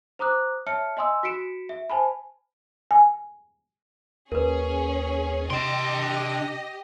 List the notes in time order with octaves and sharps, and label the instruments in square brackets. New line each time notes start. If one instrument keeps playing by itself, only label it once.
[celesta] C5 A#5 D6 D#6 F#6
C#5 E5 A5 F6 C#7
D#5 G#5 C6 D#6 E6
F#4 B6 C#7 D7 E7
E5
C5 G#5 A5 B5
[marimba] G#5
[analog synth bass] D#2 [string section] C#4 G#4 [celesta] A#4 B4
[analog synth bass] C3 [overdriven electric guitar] D4 C6 [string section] G4 D#5 [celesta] D7 E7